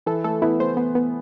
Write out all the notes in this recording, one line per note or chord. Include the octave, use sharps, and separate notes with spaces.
E3 A4
A3 A4
B3 E4
A3 C5
B3
B3